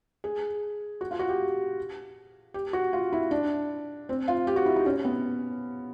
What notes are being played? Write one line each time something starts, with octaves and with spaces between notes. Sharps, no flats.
G#4
F#4
F4
F#4
G4
G4
F#4
F4
E4
D4
C4
F4
G4
F#4
E4
D#4
C#4
B3